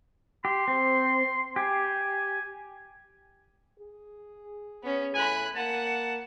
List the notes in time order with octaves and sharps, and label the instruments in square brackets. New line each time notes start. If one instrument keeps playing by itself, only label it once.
[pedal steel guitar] G4 [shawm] C6
[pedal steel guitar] C4
[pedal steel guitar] G4 [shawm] G#5
[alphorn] G#4
[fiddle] B3 C#4
[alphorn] A2 [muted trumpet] G#5 [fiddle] B5 F#6
[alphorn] A#3 [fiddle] F#5 [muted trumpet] A5